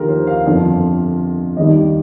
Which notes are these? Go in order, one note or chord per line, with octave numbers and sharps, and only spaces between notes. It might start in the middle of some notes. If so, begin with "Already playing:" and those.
Already playing: D#2 D3 F3 D#4 F4 G4 A#4
C5
F5
G1 F2 D3 F3
D#2 D#3 G3 D#5